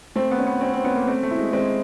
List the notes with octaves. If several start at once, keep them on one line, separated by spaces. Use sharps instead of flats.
A3 C4
B3
C#4
B3
C4 C#4
C4
B3 C#4
A#3
A3 C4
A3
E4
G#3
G#3 C4